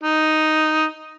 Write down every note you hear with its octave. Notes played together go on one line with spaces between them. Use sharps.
D#4